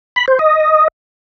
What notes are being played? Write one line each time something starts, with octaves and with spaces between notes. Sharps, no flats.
B5
C5
D#5